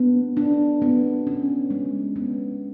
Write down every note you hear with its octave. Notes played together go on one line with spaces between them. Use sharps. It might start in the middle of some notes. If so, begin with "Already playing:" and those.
Already playing: B3 D4
D4
B3
C#4
G#3
B3